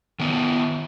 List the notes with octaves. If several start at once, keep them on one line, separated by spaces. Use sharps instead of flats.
D#3 B3 B4